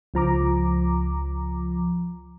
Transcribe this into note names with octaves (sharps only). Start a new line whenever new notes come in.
C#2 F3 A#5 D6